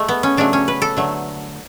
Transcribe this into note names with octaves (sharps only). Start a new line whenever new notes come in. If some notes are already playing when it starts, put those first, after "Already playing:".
Already playing: G#3 A3
B3
C#4
C#3 F#3 A3 D4
C#4
B4
A4
D3 F#3 A3